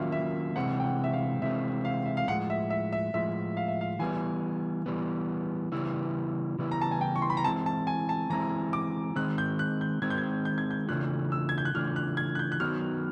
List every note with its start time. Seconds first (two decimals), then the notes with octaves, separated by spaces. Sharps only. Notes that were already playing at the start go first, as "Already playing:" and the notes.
Already playing: D#3 F#3 A#3 C#4 F4 E5 F5
0.12 E5
0.56 C3 E3 G#3 C4 F#5
0.80 G5
0.84 F#5
1.04 E5
1.13 F5
1.42 C3 E3 G#3 C4 E5
1.85 F5
2.06 E5
2.17 F5
2.28 A2 F3 G#3 F#5
2.50 E5
2.70 E5
2.93 E5
3.14 A2 F3 G#3 E5
3.57 F5
3.68 E5
3.81 F5
3.99 E3 G3 B3 G#5
4.86 E3 G3 B3
5.72 C#3 E3 G3 B3 E4
6.59 C#3 E3 G3 B3 E4
6.71 A#5
6.81 A5
6.91 G#5
7.01 G5
7.16 C#6
7.22 C6
7.30 B5
7.37 A#5
7.44 E3 G#3 C4 E4 A5
7.66 A5
7.87 G#5
8.09 A5
8.30 E3 G#3 C4 E4 A#5
8.73 D6
9.16 D#3 G#3 C4 F#6
9.38 G6
9.59 F#6
9.81 G6
10.02 D#3 G#3 C4 G#6
10.10 G6
10.18 G#6
10.45 G6
10.58 G#6
10.71 G6
10.89 C#3 E3 A3 D4 F4 F#6
11.32 E6
11.49 G#6
11.58 G6
11.65 F#6
11.75 C#3 E3 A3 D4 F4 F6
11.96 F#6
12.17 G#6
12.35 F#6
12.39 G6
12.52 F#6
12.60 D#3 F#3 B3 D#4 F#4 F6